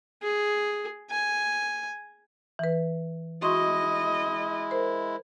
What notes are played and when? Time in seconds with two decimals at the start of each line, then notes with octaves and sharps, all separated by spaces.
0.23 G#4
1.10 G#5
2.59 E3 B4
3.42 G#3 E4 F#4 D#5 C6 C#6
4.71 A#4 C5